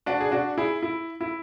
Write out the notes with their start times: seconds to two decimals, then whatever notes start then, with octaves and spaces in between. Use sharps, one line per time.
0.06 D4 F#4
0.20 G#4
0.31 D4 F#4
0.58 E4 G#4
0.82 E4
1.21 E4